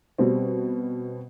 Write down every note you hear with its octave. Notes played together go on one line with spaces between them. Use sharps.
B2 G3 C4